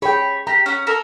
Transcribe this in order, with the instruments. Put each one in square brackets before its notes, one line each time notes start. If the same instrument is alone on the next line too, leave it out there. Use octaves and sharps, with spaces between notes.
[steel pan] G#4 G5 [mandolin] C#5 B5
[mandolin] G4 [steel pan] A#5
[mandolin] C#4 F#5
A4 A#4